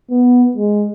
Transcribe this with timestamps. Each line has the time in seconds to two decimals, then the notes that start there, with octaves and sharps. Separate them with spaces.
0.11 B3
0.56 G#3